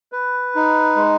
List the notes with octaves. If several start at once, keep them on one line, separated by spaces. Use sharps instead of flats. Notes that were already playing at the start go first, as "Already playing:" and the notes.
B4
D#4
G#3